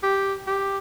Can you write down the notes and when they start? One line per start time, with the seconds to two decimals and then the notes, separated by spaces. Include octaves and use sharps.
0.03 G4
0.47 G4